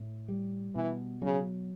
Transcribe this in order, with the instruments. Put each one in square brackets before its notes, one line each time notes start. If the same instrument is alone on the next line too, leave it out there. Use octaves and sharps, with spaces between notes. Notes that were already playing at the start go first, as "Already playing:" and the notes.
Already playing: [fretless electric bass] A2
G3
[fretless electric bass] B2 [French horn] E3
[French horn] C#3 [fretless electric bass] F#3